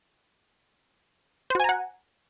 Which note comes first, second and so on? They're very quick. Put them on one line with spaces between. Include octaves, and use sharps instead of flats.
C5 F#4 G#5 A#5 F#5